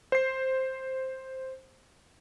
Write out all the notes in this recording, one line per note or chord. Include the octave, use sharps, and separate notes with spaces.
C5 C7